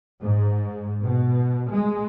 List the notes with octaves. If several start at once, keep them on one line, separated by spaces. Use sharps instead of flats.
G#2
B2
G#3